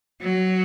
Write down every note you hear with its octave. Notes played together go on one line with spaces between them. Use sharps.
F#3